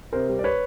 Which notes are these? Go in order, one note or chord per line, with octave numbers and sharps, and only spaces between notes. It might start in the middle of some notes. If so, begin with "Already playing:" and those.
C3 A#4 C5
G3
D5
B4 C#5